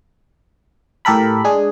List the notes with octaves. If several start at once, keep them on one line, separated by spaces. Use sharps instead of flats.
A2 G4 A4 A#4 B5
G#3 D4 G#4